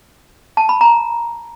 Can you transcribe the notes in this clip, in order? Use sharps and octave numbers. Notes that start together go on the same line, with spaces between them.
A5
B5
A#5